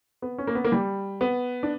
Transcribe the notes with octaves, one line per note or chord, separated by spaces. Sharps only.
B3
C#4
A#3
B3
A#3
G3
B3
D4